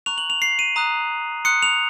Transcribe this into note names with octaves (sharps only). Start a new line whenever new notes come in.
A#5 C#6 F#6 F7
F#7
F7
C7
D#7
A#5 D#6 F#6
C6 D#6 F#6 C#7
F7